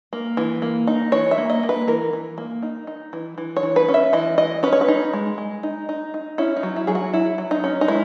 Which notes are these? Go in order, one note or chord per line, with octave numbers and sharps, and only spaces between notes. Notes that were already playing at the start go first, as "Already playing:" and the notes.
A#3
E3
A#3
D#4
E3 C#5
E5
A#3
D#5
A#3
B4
E3 A#4
E3
A#3
D#4
D#4
E3
E3
C#5
E3
B4
C#4
E5
E3 D#5
E3 D#5
C#4 B4
C#5
B4
D#4
G#3
G#3
D#4
D#4
D#4
C#4 E4
D#4
F#3
E4
F#3 G#4
F#4
F#3 E4
F#3
D#4
C#4
D#4
G#3 E4